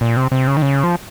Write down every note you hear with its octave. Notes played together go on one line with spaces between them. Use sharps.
A#2
C3
C3
C#3
D#3
C#3
F3